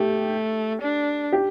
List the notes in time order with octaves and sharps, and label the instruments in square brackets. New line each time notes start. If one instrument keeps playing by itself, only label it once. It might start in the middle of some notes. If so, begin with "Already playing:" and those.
Already playing: [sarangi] A3 [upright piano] G4
[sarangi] D4
[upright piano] G4